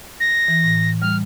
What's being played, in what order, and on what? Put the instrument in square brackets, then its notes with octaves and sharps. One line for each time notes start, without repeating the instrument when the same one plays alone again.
[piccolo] A#6
[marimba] E3
A2
[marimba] G3 [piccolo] F6